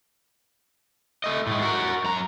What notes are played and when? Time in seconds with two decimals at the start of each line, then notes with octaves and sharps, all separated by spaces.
1.24 A3 D#5
1.47 A2 G#3
1.62 F#4 A#4
2.04 F#2 A#5